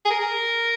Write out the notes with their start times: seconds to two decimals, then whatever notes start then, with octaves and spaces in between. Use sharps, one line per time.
0.05 G#4
0.10 A#4